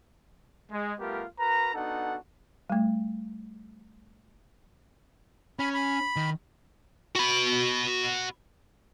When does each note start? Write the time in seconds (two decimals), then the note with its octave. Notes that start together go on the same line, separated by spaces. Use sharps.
0.71 G#3
1.00 G3 A3 B3 F4 G4 A#4
1.39 F#4 A#4 B4 A#5
1.74 B3 D4 D#4 F#4 A4 F#5
2.70 G3 A3
5.59 C#4 B5
5.74 B5
6.16 D#3
7.16 F#4 B5